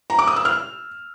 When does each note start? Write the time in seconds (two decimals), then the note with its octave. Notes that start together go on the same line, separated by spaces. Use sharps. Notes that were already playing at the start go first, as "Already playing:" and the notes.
0.10 A#5
0.19 D6
0.27 D#6
0.36 E6
0.45 F6